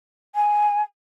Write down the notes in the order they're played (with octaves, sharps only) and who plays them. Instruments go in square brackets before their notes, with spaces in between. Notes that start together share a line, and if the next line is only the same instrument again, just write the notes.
[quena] G#5